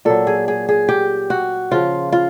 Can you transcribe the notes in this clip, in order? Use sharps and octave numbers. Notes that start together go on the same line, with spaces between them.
A#2 F#3 A4
G#4
G#4
G#4
G4
F#4
C#3 F3 F4
F4